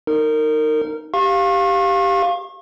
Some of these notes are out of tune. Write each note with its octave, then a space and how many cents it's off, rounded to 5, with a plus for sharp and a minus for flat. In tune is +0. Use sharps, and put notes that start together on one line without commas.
D#4 +0 A#4 -25
G4 +0 F5 +0 C#6 -40